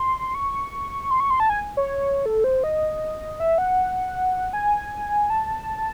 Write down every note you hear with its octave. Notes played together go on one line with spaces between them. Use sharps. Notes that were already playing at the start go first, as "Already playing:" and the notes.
Already playing: C6
C#6
C6
C#6
C6
A5
G#5
C#5
A4
C5
D#5
E5
F#5
G#5
A5